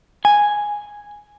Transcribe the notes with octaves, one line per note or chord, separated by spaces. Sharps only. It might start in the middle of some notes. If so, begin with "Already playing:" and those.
G#5